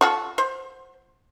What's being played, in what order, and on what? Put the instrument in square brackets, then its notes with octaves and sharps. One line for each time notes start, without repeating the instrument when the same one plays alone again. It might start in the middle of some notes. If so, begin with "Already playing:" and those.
[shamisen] F4 F#4 A4 [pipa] C#6
[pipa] C5